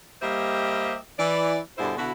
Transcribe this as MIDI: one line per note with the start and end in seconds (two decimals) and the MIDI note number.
0.22 0.96 55
0.22 0.96 58
0.22 0.96 67
0.22 0.96 72
0.22 0.96 75
0.22 0.96 76
1.19 1.58 52
1.19 1.58 74
1.78 1.96 43
1.78 1.96 47
1.78 1.96 50
1.78 1.96 64
1.78 1.96 68
1.78 1.96 72
1.98 2.12 47
1.98 2.12 50
1.98 2.12 64
1.98 2.12 66